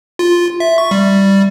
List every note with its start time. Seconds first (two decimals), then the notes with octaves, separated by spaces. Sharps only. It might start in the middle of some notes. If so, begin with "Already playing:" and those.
0.19 F4
0.60 E5
0.78 C#6
0.91 G3